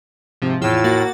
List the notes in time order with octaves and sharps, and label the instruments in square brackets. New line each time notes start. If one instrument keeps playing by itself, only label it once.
[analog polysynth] G#2 C3 F3
[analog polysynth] E2 F4 E6 [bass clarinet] A2
[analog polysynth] A#3 F#4 A6